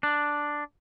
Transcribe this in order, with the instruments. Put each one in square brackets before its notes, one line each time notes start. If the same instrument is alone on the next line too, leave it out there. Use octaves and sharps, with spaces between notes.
[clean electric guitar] D4